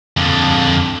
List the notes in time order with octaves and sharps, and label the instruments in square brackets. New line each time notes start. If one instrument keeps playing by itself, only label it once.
[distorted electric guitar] F2 D3